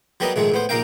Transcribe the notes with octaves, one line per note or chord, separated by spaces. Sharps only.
F#3 G3 B3 G4 A#4 D#5
A#1 G#2 D#3 G#3 A3
A2 B3 C5
A#1 A#3 D#4 A#4 F5 G5